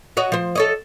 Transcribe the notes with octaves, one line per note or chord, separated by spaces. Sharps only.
F#4 C#5 D#5
F3 C5
A4 C#5 D#5